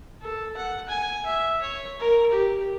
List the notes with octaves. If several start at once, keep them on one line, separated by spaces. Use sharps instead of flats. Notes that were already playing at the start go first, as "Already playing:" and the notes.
A4
F#5
G#5
E5
C#5
A#4
G4